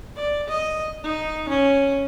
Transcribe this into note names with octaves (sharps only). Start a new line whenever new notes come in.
D5
D#5
D#4
C#4